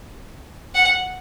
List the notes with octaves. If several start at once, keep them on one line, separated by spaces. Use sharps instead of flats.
F#5